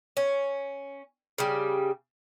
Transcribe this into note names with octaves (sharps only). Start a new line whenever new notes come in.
C#4
C#3 G3